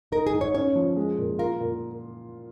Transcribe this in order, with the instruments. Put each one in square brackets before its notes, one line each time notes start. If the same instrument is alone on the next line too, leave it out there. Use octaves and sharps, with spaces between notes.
[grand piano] D#4 [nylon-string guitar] A#4
[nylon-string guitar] G#4
[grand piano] G#2
[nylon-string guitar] C#5
[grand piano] C#4 [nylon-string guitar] C#5
[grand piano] F3
G#3
A#2
[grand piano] F4 [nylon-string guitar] A#4
[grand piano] A#2